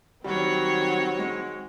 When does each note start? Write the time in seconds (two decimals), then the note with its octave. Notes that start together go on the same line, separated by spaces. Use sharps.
0.24 D#3 F#3 G3 C4 F#4 C#5
1.19 G#3